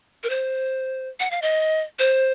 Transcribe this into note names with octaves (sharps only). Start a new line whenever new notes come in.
A#4
C5
F#5
F5
D#5
C5